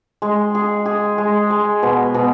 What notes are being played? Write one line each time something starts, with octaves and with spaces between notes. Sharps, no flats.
G#3
G#4
G#4
G#3
G#3
B2
B2